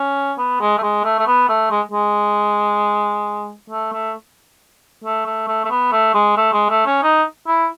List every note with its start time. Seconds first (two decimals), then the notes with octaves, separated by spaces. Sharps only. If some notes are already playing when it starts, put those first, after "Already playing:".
Already playing: C#4
0.38 B3
0.61 G#3
0.78 A3
0.83 G#3
1.04 A3
1.19 A3
1.27 B3
1.49 A3
1.71 G#3
1.92 G#3
3.70 A3
3.93 A3
5.04 A3
5.26 A3
5.48 A3
5.65 A3
5.70 B3
5.92 A3
6.14 G#3
6.37 A3
6.53 G#3
6.70 A3
6.86 C#4
7.03 D#4
7.47 E4